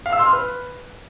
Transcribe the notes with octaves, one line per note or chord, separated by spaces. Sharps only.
F5
E6
C6
F6
B4